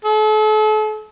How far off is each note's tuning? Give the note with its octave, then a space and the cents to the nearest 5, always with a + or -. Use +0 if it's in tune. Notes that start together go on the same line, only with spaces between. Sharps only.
A4 -40